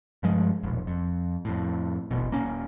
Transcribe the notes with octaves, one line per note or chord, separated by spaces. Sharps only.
G2 F3 G#3
E1 A#1
F2
F2 A2
D1 A1 B2
D#1 A#3 C#4